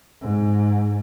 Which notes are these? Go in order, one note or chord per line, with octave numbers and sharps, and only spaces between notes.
G#2